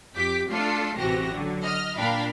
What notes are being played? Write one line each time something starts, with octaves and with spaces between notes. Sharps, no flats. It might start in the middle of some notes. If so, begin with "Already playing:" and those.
F2 G4 D6 B6
A3 D4 F4 A4 C7
A1 C3 E3 F#4 G4 A#6
D3 F#3
D#5 F6
A#2 D4 A#4 F5 G5 B5